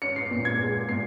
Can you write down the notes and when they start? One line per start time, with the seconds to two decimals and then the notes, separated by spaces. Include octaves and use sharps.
0.02 C#4 C#7
0.16 C7
0.31 A#2
0.45 G#6
0.60 G#3
0.89 A#2 C7